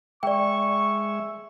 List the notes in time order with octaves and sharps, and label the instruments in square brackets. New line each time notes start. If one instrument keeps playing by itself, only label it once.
[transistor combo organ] G#3 E5 [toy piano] D5 G5 [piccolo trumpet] C#6